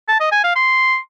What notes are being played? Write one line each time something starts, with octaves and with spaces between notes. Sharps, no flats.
A5
D#5
G#5
F5
C6